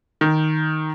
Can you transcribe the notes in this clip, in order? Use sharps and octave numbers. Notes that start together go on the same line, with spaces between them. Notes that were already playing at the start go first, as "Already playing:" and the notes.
D#3